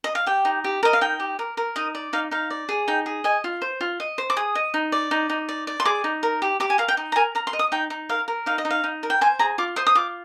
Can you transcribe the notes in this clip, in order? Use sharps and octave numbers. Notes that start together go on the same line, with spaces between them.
D#5
F5
G4 G5
D#4
G4
A#4 D#5
F5
D#4 G5
G4
A#4
A#4
D#4 D#5
D5
D#4 F5
D#4 F5
D5
G#4
D#4 G5
G#4
D#5 G#5
F4
C5
F4
D#5
C5
D6
G#4 D#6
D#5
D#4
D5
D#4
D#4
D5
D5
C6
G#4 D6
D#4
A#4
G4
G4 D6
G#5
A#4 F5
G5
D#4
A#5
A#4 G#5
A#4 A#5
C6
D#5
D#6
D#4 G5
D#4
A#4 F5
A#4
D#4 F5
D#5
D#4
F5
D#4
A#4
G5
C5 G#5
G#4 A#5
F4 D6
C5 D#6
D#6
F4 D6